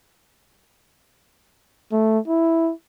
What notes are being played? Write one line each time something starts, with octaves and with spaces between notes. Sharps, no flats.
A3
E4